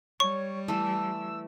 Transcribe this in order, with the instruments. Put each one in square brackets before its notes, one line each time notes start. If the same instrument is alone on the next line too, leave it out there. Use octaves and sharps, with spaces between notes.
[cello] G3 [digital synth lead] C#5 [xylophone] C#6
[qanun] E3 A3 [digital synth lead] E6